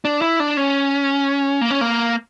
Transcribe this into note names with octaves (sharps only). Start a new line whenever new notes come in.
D4
E4
D4
C#4
A#3
C#4
A#3